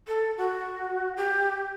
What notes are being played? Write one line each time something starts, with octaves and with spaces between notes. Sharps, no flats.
A4
F#4
G4